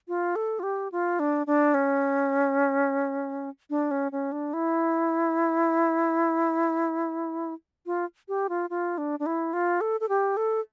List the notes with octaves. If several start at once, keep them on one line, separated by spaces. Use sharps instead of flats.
F4
A4
F4
G4
F4
D4
D4
C#4
D4
C#4
C#4
D4
E4
F4
G4
F4
F4
D4
D4
E4
F4
A4
A4
G4
A4